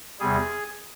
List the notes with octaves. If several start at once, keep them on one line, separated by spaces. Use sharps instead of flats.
E2 C3 G3 G#4